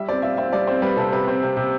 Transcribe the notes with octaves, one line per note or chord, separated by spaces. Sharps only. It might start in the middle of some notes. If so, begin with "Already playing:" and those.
Already playing: G3 E5
C4 D5
F4 E5
C4 E5
G3 D5
C4 C5
G3 B4
C3 A4
C3 B4
C4
C3
C3